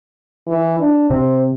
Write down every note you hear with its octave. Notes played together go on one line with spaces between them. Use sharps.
E3
D4
C3 C5